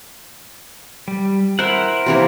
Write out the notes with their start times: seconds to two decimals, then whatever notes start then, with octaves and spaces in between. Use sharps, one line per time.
1.08 G3
1.59 E4 A#4 C5 E5 F#5
2.06 C3 E3 A#3